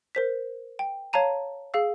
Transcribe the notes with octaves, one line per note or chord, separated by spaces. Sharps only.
A#4 C5 B6
G5
C#5 F5 A5 A#5 D#7
G#4 F5 E6